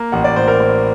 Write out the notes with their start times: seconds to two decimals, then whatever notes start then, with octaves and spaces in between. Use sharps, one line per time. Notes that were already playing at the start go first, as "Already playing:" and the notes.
Already playing: A#3
0.12 A1 F#5
0.24 D5
0.36 A2 C5
0.48 A#4
0.60 A2 C5